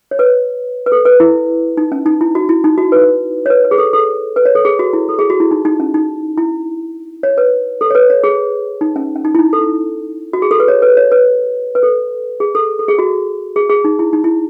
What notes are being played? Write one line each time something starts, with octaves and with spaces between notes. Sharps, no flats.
C#5
B4
B4
A4
B4
E4
D#4
C#4
D#4
E4
F#4
E4
D#4
F#4
B4
C#5
B4
B4
G#4
A4
A4
B4
C#5
A4
G#4
F#4
E4
A4
G#4
F#4
E4
D#4
D#4
C#4
D#4
E4
C#5
B4
A4
C#5
B4
C#5
G#4
D#4
C#4
C#4
D#4
E4
D#4
A4
F#4
G#4
A4
B4
C#5
B4
C#5
B4
B4
A4
G#4
A4
A4
G#4
F#4
G#4
G#4
D#4
E4
D#4
E4